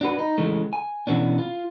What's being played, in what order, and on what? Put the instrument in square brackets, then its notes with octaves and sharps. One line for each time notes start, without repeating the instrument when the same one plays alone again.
[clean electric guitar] D4 F#4 B4
D#4
C#3 E3 G#3 A3
G#5
B2 E3 B3 C#4 D4
F4